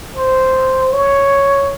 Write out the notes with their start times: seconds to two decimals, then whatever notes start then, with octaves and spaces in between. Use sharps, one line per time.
0.16 C5
0.93 C#5